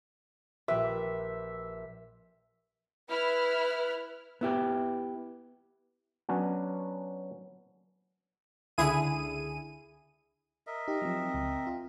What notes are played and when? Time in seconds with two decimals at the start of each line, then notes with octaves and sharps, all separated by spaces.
0.68 A#1 G4 B4 E5
3.10 E4 B4 F6
4.41 B3 E4 G4
6.29 F#3 B3 C#4 D4 F#4
8.78 C#2 D3 E4 G#4 D#7
10.67 A#4 D#5 E5
10.88 D#4 G4
11.02 F3 F#3 C4
11.34 C#2
11.67 F4